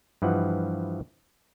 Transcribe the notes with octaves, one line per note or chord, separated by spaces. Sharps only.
G2 E3 F3 D#5 F#5